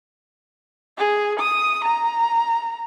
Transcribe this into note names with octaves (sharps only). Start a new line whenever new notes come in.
G#4
D#6
A#5